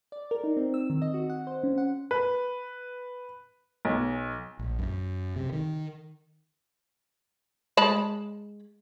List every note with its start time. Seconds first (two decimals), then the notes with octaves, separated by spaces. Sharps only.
0.12 D5
0.31 A#4
0.44 D#4
0.57 C4
0.74 E6
0.90 D#3
1.02 D#5
1.14 F#4
1.30 F#5
1.47 C5
1.63 C#4
1.78 F#5
2.11 B4
3.85 B1
4.59 A#1
4.79 F#2
5.36 C3
5.52 D#3
7.77 G#3 A5 B5